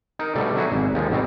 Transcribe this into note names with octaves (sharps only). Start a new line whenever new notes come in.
D#4 A#4
B2 D3 G3 A3
F#3 E4 F#4 G#4
G#1 G#2
D#2 F3 G#3
A1 B2 G3 C4